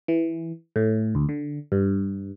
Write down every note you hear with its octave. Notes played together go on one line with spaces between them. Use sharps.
E3
A2
D2
D3
G2